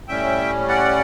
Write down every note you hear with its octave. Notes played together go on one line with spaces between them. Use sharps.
A2 G3 C#4 E5 G5
D5 F#5